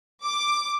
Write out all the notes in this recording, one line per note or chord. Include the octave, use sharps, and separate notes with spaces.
D6